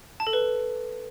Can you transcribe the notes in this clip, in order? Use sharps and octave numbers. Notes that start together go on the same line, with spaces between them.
A5
A4
B4